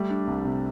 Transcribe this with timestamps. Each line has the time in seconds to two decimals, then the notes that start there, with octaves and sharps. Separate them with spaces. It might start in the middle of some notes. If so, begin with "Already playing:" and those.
Already playing: G3 A3
0.10 D4
0.27 C2
0.45 C3